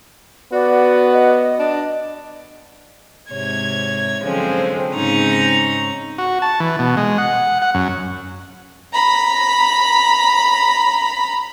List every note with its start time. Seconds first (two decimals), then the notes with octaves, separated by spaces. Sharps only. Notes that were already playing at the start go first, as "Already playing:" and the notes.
0.52 B3 F#4 D5
1.12 D#5
1.59 D4
3.31 G#2 C3 C#5 G#6
4.23 D3 F3 F#3 G#3 C4 C#4
4.92 G#2 C#3 C4 C#4 D#4 A#5
6.18 F#4
6.42 A5
6.60 E3
6.79 B2
6.97 G#3
7.18 F#5
7.62 F#5
7.74 F#2
8.93 A#5 B5